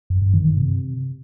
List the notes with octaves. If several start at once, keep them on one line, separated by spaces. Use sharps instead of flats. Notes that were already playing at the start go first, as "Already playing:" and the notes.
F#2
G2
D#3
G2
C3